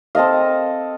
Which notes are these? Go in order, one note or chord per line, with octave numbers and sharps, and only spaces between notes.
C4 A4 D#5 F5